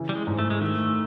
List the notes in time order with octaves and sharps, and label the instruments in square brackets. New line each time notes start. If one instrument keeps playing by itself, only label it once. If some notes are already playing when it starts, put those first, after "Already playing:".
Already playing: [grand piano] C#3 E3
[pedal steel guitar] G3
G#3
[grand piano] G#2
[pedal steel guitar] A3
G#3
[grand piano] D#3 [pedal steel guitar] A3